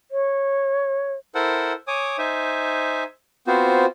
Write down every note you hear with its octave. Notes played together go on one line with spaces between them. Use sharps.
C#5
E4 A4 A#4 C5 F#5
C#5 G#5 D6 D#6
D#4 C5 E5 G#5
B3 C4 F4 F#4 C5